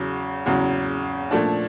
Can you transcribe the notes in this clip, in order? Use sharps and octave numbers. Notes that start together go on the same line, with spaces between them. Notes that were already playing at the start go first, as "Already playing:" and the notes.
Already playing: E2 C#3 F#3
E2 C#3 F#3
A#2 F3 A3 D4